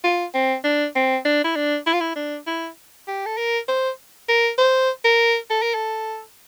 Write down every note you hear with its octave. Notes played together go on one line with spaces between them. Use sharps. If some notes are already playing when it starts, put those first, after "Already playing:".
F4
C4
D4
C4
D4
E4
D4
E4
F4
E4
D4
E4
G4
A4
A#4
C5
A#4
C5
A#4
A4
A#4
A4